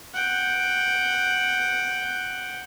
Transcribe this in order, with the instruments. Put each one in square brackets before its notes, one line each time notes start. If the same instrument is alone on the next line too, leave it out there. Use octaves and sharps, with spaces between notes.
[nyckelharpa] F#5 G5